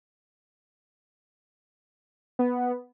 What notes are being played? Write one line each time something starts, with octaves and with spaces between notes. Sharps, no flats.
B3